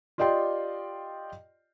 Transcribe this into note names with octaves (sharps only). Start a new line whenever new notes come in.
F4 G4 D5 D#5 G5 C6